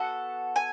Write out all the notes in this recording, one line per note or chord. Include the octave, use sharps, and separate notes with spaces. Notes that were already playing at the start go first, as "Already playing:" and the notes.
Already playing: B3 F#4 A4 F#5
G#5